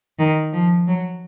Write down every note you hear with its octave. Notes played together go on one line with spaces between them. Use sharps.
D#3
F3
F#3